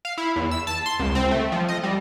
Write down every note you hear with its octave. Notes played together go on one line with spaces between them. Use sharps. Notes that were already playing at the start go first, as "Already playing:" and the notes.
F5
E4
E2
E6
A5
C6
C#2
C4
A3
F3
D#5
G3